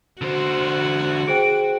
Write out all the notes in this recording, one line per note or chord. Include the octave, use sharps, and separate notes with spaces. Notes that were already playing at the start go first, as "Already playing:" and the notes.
D3 F#4 C5
G#4 C5 G5 D7